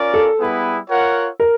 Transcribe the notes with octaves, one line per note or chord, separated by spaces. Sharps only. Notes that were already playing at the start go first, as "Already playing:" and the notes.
Already playing: C#4 F4 A#4 D5
A4
G3 B3 E4 G#4 B4
F4 A#4 C#5 F#5
A#4